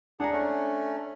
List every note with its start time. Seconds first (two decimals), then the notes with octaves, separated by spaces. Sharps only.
0.20 D4 G#4 F#5 A#5
0.32 A3 C#4